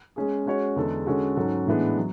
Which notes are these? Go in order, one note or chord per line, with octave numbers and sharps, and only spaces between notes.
G#3 C#4 G#4
G#3 C#4 F#4 C#5
E2 D3 G#3 D4 A4
D3 G#3 C#4 F#4 A4
G#2 F#3 C#4 F#4 A4
A2 E3 G#3 B3 D4
F#3